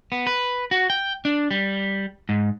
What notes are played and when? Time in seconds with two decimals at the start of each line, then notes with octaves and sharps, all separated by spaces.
0.12 B3
0.27 B4
0.71 F#4
0.90 G5
1.25 D4
1.51 G3
2.29 G#2